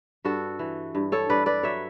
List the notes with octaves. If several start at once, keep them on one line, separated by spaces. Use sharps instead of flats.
G2 F#4 A4
E3
G2
A4 C#5
G2 B4 D5
B4 D5
F#3 C#5 E5